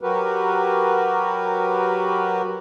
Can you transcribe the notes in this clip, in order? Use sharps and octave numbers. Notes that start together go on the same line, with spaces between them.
F#3 F#4 G4 A#4 B4